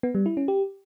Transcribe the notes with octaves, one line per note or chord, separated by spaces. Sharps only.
B3
G3
E4
C#4
G4